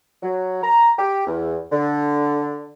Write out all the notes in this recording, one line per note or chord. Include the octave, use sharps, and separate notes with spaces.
F#3
A#5
G4
E2
D3